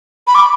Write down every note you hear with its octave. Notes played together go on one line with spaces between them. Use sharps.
B5
D6